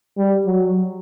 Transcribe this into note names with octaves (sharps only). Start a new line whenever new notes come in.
G3
F#3